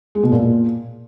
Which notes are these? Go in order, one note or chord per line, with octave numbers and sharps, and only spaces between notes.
G#3
B2
A#2